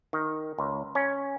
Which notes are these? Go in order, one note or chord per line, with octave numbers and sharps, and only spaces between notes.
D#3
C#2
C#4